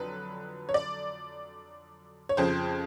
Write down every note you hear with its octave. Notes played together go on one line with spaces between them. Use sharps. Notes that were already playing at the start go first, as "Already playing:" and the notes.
Already playing: F2 D3 F#3 B4
C#5
D5
C#5
F2 C#3 F3 C5